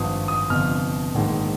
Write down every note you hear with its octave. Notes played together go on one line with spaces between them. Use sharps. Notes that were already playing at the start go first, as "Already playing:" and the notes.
Already playing: G#1 G2 F3 D#6
D#6
G1 F2 C3 F3 F6
A#1 G#2 D#3